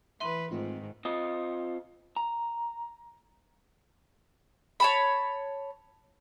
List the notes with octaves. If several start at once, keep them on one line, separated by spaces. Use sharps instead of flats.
E3 B4 E5 C6 D#7
G#2 D#3 A3 C4 F4
C4 F4 D#5
A#5
C#5 A5 B5